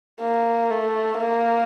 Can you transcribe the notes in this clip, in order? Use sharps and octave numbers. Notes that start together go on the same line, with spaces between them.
A#3
A3
A#3